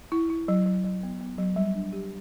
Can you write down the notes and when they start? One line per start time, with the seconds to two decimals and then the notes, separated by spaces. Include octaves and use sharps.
0.12 E4
0.30 E4
0.48 F#3
0.66 F#3
0.84 F#3
1.03 B3
1.21 B3
1.38 F#3
1.56 G3
1.75 D4
1.93 G4